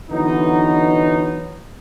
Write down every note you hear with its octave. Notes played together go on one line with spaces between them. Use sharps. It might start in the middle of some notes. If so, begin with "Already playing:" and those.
D3 E3 F#3 B3 D#4